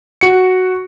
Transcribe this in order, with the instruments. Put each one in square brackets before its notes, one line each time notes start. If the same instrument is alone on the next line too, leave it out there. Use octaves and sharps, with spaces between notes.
[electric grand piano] F#4 C#7